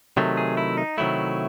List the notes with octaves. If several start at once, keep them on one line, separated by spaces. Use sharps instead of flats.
C3 D#3 F#3 A3
G#4
E4
D#4
C3 D#3 F#3 A3 E4